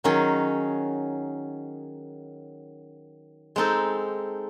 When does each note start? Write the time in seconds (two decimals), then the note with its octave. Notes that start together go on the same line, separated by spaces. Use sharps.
0.04 D#3 F#3 C#4 G#4
3.56 G#3 C4 D#4 A4